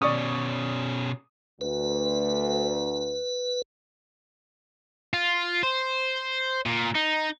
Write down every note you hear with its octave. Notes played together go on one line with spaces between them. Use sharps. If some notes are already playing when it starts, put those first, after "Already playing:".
B2 C#4 D5 C#6 D#6
D2 B4
F4
C5
A#2
D#4